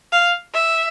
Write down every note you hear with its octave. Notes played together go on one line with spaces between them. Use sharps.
F5
E5